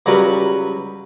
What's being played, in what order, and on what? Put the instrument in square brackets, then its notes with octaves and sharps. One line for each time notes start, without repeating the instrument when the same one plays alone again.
[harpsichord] C#2 F#3 G3 F#4 A#4 B4